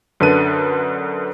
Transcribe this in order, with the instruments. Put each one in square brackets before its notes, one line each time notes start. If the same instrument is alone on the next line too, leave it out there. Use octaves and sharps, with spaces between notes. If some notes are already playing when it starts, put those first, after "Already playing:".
[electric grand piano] F#2 D3 B4 A5 D#7